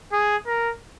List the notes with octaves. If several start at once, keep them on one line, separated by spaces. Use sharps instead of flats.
G#4
A#4